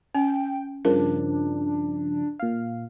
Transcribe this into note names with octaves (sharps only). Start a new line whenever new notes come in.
C#4 G5
G2 C#3 F3 D4 A#4
A#2 F5